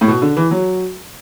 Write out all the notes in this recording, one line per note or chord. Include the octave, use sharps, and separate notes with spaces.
A2
B2
D3
E3
F#3